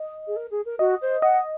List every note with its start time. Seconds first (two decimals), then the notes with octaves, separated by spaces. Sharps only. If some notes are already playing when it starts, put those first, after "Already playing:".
Already playing: D#5
0.27 G#4
0.36 A#4
0.51 G#4
0.65 A#4
0.79 F#4 D#5
1.01 C5
1.22 D#5 F#5